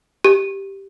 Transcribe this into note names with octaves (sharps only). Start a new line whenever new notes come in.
G4